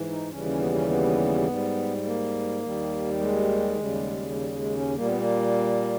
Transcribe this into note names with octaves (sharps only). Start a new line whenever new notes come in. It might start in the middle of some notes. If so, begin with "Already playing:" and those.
Already playing: G#2 E3
D#4
D#2 C#3 E3 G3 C#4
C#4
B3
C#4
B3
G#2 G3
A#3
D#2 D#3 G3
G#3
D#2 C#3 G3
G#3
G3
G#3
C#4
A#2 G3 A#3
B3
A#3